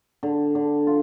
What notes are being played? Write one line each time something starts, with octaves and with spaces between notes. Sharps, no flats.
D3
D3
F4